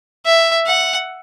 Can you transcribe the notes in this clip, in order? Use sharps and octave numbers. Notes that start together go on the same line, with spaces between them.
E5
F#5